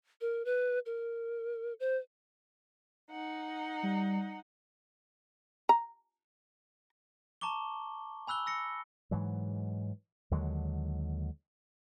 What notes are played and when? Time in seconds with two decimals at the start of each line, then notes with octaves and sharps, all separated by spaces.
0.21 A#4
0.45 B4
0.86 A#4
1.80 C5
3.10 D#4 F#5
3.83 G3
5.69 A#5
7.41 A5 A#5 C#6 D6 G7
8.27 G#5 B5 E6 F#6 G7
8.46 E6 A#6 C#7
9.11 G#2 E3 F#3
10.31 D#2 D3 F#3 G#3